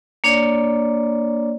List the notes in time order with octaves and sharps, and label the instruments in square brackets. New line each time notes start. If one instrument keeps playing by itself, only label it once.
[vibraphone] A#3 D4 C#5 D5